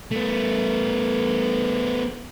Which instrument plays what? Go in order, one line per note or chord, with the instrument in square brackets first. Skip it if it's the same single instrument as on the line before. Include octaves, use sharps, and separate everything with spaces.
[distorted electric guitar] A3 B3